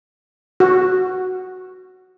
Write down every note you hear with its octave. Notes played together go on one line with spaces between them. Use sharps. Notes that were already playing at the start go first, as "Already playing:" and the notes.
F#4